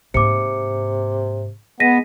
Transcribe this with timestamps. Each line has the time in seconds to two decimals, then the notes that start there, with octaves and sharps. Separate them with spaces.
0.14 G#2 C3 A#3 D6 C#7
1.80 G#3 B3 A#6 B6 D#7